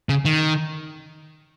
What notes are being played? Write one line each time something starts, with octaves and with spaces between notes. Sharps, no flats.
C#3
D#3